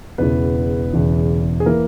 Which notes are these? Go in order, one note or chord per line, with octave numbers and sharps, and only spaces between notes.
E1 E2 C#3 E3 B3 B4
E1 E2 C#3 E3
G#4
E3 A#3 A#4